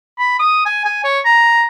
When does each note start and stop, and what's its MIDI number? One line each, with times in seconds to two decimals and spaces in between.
0.19 0.35 83
0.39 0.64 87
0.66 0.82 80
0.85 1.01 80
1.04 1.20 73
1.25 1.64 82